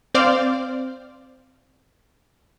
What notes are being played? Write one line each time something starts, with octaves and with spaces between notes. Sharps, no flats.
C4 C5 D5 F5